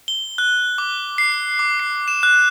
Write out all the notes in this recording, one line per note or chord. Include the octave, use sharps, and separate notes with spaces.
G7
F#6
D6
C7
D6
C7
E7
F#6